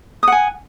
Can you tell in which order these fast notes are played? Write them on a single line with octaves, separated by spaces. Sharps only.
D#6 F#5 G#5